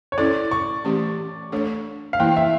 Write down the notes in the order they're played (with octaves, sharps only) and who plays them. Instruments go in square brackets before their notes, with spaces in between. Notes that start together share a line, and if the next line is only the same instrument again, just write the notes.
[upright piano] C#5
[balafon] C#4 E4 A4 [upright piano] D5
[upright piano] C#6
[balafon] E3 A3 C#4 G4
A3 D4 A4 C#5
[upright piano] F5
[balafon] E3 A#3 E4 [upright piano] G5
[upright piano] E5